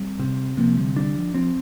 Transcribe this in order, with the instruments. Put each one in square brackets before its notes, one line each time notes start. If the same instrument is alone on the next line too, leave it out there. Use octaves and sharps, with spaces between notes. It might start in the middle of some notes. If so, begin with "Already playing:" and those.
Already playing: [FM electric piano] G3 C4
[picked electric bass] C3
[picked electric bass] C3 [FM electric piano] F3 A#3
[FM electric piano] D3 G3
[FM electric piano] D3 G3 [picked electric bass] D4
[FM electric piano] F3
[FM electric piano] F3 [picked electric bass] C4